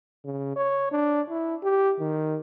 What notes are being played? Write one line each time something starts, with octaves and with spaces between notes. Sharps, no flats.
C#3
C#5
D4
E4
G4
D#3